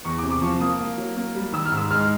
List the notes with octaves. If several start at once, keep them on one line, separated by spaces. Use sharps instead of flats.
E2 C#6
D6
C3
D6
F3 C#6
A#3 D#6
A#3
F#3
A#3
G3
D#3 E6
F6
G#2
E6
G#3 F6
F6